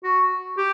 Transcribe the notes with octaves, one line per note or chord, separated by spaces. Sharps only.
F#4
G4